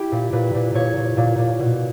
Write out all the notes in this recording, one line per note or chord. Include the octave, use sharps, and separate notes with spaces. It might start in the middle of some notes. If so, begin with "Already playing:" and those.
Already playing: E4 G4
A#2
A#2 B4
A#2
A#2 C#5
A#2
A#2
A#2
B2